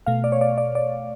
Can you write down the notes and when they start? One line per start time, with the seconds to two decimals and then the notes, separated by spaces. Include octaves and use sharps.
0.06 B2 A3 F5
0.24 D5
0.32 C#5
0.41 D5
0.58 D5
0.75 D5